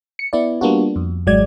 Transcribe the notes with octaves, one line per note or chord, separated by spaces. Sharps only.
C#7
B3 E4 D5
G3 A#3 B3 D4 F4 F#4
F2
G#1 F#3 G#3 D5 G#6